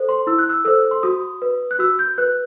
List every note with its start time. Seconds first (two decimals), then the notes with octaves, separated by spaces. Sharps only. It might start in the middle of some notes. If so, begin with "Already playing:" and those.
Already playing: A4 C5
0.09 C6
0.27 E4 E6
0.39 F#6
0.49 E6
0.65 A4 C5 E6
0.91 C6
1.03 F#4 D#6
1.42 B4
1.71 F#6
1.79 F#4 E6
1.99 G6
2.18 B4 F#6